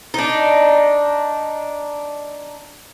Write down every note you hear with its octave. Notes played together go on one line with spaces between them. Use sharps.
D4 D#4